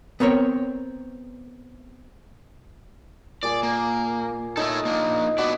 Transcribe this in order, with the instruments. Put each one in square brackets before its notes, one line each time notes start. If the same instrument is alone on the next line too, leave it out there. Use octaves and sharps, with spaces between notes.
[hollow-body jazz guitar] B3 C4 A#4 C#5
[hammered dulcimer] A#2 G#4 D6 [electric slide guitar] D5
[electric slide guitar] A#3
[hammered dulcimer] D#4 [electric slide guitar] A4 C#5 E5
[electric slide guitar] A#3 D4
[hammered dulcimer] B3 F#4 D5 [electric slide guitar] D4 B4